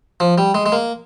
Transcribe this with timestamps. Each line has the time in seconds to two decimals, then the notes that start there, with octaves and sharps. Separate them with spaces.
0.20 F3
0.38 G3
0.55 G#3
0.66 G#3
0.72 A#3